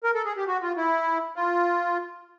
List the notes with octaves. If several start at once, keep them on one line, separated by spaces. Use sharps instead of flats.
A#4
A4
G#4
G4
F#4
F4
E4
F4